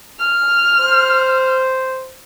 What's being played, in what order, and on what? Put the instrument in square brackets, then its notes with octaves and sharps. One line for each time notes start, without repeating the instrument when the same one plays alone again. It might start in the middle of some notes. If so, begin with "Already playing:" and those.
[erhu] F6
[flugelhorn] C5